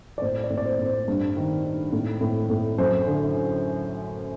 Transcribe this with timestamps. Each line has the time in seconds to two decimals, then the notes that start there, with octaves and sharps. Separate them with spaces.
0.18 D5
0.22 A2 C5
0.44 D5
0.50 A2
0.57 D5
0.65 C5
0.79 A2
0.86 C5
1.08 G2
1.36 D#3
1.64 D#3
1.93 A2
2.21 A2
2.50 A2
2.78 F#2 C5
3.07 D3